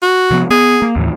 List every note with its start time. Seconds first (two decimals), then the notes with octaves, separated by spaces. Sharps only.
0.02 F#4
0.31 C3 F3 B3
0.50 B3 G#4
0.82 A#3
0.96 D#2 A2 E3